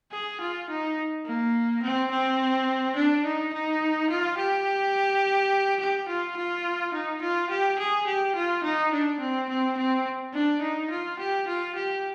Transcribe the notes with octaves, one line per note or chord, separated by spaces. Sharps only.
G#4
F4
D#4
A#3
C4
C4
D4
D#4
D#4
F4
G4
G4
F4
F4
D#4
F4
G4
G#4
G4
F4
D#4
D4
C4
C4
C4
D4
D#4
F4
G4
F4
G4